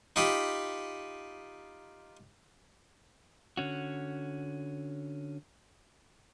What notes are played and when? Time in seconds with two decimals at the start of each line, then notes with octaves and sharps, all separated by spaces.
0.16 D#4 F4 G4 D#5 B5
3.57 D3 C#4 F#4